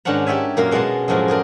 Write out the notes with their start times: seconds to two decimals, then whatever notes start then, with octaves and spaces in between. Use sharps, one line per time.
0.05 G#2 D#3 C#4 D4 F#5 A#5
0.27 G4 C#5 D5 E5 G#5
0.57 F#2 A#2 A#3 F#4 F5 A#5
0.71 B2 G#3 A#4 F#5 A5
1.08 F#2 A2 F3 G#3 F#4
1.28 D#4 G#4 A#4 D5